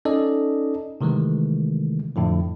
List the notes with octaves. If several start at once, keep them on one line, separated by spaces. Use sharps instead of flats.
C#4 D#4 A4 D5 D#5
C3 D#3 E3 G#3 A3
F2 A2 D3 F3